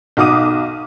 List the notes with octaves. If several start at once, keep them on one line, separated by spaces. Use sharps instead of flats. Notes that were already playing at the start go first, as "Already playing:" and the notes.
B1 F#4 D6 D#6 D#7